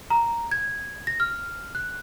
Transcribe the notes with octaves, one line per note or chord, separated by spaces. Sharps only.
A#5
G#6
A#6
F6
F#6